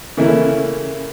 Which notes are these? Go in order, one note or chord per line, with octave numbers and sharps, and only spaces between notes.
C#3 E3 A3 A#3 C#4 E4